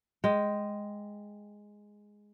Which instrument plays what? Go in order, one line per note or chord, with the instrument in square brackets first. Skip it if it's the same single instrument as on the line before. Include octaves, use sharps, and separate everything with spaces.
[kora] G#3 G5